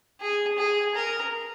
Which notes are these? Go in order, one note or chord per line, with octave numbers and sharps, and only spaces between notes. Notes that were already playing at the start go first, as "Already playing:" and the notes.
G#4
G#4
A#4